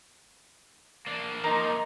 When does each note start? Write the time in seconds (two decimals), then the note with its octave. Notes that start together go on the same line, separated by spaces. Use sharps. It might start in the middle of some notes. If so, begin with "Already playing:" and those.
1.07 A#3 D4
1.44 D#3 F3 A#3 D#4 A#5 C6